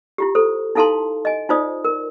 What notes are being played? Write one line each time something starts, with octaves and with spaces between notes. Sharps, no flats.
E4 F4 G4
A4 C5
D#4 E4 A4 F5 A5 C6
D#5 G#5
D#4 F4 C5 D5 D#6
A#4